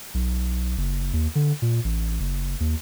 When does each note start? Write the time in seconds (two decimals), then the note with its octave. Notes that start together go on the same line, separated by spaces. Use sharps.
0.14 B1
0.77 F#1
1.13 D#2
1.35 D3
1.62 A#2
1.84 A1
2.20 F#1
2.60 D#2